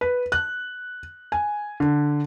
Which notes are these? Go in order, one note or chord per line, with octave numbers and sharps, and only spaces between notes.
B4
F#6
G#5
D3